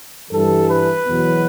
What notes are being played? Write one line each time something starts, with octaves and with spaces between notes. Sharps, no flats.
G2 E3 G3 A4
B4
E2 B2 F#3 B3